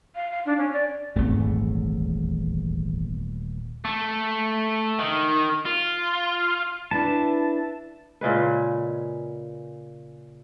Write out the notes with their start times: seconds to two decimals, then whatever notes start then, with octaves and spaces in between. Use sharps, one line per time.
0.15 F5
0.31 F5
0.45 D4
0.58 C#4
0.72 D5
1.16 D#1 G#1 E2 A3
3.85 A3
4.99 D#3
5.65 F4
6.91 D4 E4 B4 A5
8.21 A#2 C#3 G#3 B4